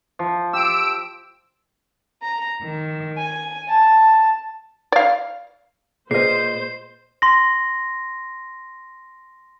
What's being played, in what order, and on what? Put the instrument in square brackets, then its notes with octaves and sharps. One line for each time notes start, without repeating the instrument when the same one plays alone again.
[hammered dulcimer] F3
[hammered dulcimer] G4 [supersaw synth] E6 D7
[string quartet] A#5
D#3
G#5
A5
[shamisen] D5 F5
[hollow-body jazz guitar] A#2 D#5 [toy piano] G#4 B4 [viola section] C5 [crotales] C7
[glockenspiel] C6 A#6